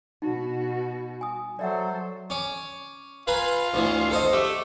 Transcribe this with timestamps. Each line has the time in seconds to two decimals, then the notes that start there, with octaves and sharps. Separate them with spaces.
0.22 B2 D#4 F#4
1.21 G#5 D#6
1.59 F#3 A4 C5 D5 E5 F#5
2.30 C#4 D6
3.27 F4 B4 G#5 A#5
3.74 D2 A2 E3
4.11 A4 C5 D#5
4.33 A3 G4